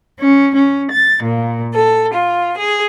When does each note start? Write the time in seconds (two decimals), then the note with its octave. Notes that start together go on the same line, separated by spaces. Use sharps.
0.21 C#4
0.55 C#4
0.90 A6
1.23 A#2
1.75 A4
2.13 F4
2.57 G#4